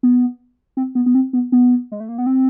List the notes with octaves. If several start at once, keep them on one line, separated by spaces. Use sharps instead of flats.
B3
C4
B3
B3
C4
B3
B3
G#3
A3
A#3
B3
C4